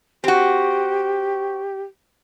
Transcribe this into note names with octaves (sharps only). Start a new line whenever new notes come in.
C4 F#4 G4